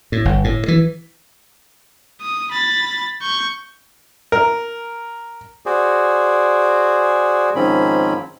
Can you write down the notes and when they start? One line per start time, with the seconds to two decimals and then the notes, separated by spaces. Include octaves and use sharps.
0.12 A2
0.25 G1
0.44 A2
0.68 E3
2.21 D#6
2.52 B5 A6
3.22 C#6 G6
4.32 A#4
5.66 F#4 G#4 C5 D5
7.56 G#2 D#3 F3 C4 C#4 B5